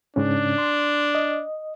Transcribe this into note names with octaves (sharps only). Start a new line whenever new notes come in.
G#2 C#3 C#4 D4
C6
D#5